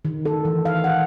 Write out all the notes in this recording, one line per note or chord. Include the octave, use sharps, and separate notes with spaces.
D#3
A4
E3
F5
F#5